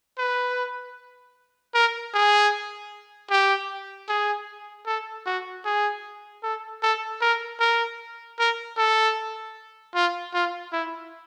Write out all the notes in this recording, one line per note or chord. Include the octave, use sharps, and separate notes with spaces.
B4
A#4
G#4
G4
G#4
A4
F#4
G#4
A4
A4
A#4
A#4
A#4
A4
F4
F4
E4